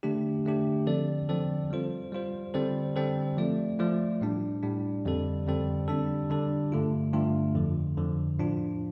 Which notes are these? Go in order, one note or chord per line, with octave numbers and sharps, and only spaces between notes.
D3 A3 D4 G4
D3 A3 D4 G4
D3 F3 C4 A4 D5
D3 F3 C4 A4 D5
G3 F4 C5
G3 F4 C5
D3 G3 C4 A4 C5
D3 G3 C4 A4 C5
F3 A3 F4 D5
F3 A3 F4 D5
A2 G3 D4
A2 G3 D4
F2 D3 G3 C4 A4
F2 D3 G3 C4 A4
D3 G3 D4 A4
D3 G3 D4 A4
G2 D3 A3 F4
G2 D3 A3 F4
F2 D3 F3
F2 D3 F3
A2 F3 D4 F4